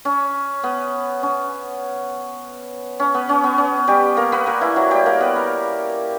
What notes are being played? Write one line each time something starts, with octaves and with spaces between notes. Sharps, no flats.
C#4
B3
C#4
C#4
B3
C#4
B3
C#4
G3 G4
A#3 A#4
B3 B4
A#3 A#4
E3 E4
F#3 F#4
G3 G4
A#3 A#4
B3 B4
A#3 A#4